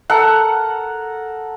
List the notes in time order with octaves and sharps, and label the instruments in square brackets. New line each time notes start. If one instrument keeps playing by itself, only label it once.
[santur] A4 A#4 F#5